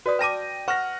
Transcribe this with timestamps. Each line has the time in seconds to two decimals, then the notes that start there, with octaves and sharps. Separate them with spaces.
0.06 F#4 B4 D5 D#6
0.19 B4 G5 A5 D6 A#6 D#7
0.68 B4 F#5 C#6 F6 A#6